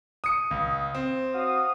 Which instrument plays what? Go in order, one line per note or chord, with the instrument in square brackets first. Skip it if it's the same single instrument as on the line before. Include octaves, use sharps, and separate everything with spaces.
[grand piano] D#6 C#7
C#2
C4
[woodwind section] F#4 F5 D#6